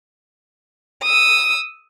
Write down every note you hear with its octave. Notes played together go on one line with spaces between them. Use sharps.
D#6 E6